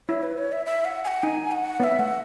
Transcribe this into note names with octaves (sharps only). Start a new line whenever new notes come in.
E4 C#5
B4
C#5
E5
E5
F#5
G#5
F#5
D#4 G#5
F#5
B3 E5 F#5
A3 F#5